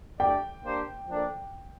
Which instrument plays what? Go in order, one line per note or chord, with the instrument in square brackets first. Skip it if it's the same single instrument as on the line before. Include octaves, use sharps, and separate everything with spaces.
[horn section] A3 D4 G4 D5 [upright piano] G5
[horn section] A#3 D4 G4 C5
F3 A#3 D4 A4 D5